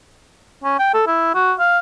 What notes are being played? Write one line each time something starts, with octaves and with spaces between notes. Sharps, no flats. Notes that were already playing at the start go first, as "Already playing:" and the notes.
C#4
G5
A4
E4
F#4
F5